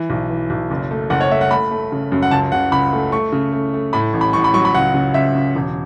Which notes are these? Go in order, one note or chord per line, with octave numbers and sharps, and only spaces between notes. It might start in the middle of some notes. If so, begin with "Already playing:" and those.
Already playing: E3
B1
E3
B1
F#1
A3
F#1 F#5
C#5
A3 E5
F#5
A3 B5
A3
C#3
F#2
F#5
C#2 A5
C#3 F#5
C#2 B5
A3
A3 C#6
C#3
A3
A3
A2 B5
A1
B5
A1 C#6
B5
F#3 C#6
B5
C#2 F#5
C#3
C#2 E5
C#3
E1